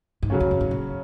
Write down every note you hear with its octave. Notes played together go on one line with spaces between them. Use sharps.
G#2
F#2 C#3 F#3 C#4
F2
F#2
G#2
A#2